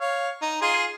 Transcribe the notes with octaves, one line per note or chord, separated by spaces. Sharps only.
C#5 F5
D#4
F4 G#4 C6